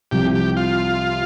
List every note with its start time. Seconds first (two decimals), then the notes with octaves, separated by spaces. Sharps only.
0.11 C2 C3 F3 G4
0.35 G4
0.57 F4